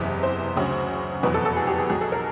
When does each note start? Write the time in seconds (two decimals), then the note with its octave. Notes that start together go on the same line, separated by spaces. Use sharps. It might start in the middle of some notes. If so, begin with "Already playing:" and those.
Already playing: F#1 E2 C3 B4
0.23 C5
0.56 D2 C#3 F#3
1.23 F1 E2 B2 F#3 B4
1.34 A4
1.45 A4
1.56 G#4
1.67 G4
1.78 G#4
1.89 B1 B2 F#3 G#4
2.01 A4
2.12 A#4